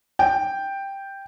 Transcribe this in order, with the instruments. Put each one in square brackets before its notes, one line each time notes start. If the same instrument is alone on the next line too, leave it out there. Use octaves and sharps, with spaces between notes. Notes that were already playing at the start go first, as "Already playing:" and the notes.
[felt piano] G5